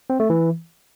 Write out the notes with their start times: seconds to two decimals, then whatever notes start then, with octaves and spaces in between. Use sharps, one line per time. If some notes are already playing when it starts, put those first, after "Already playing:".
0.10 C4
0.20 A3
0.30 E3